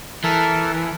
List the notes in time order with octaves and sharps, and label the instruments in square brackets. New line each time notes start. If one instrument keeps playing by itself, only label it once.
[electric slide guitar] E3 [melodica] A4 A#4 A5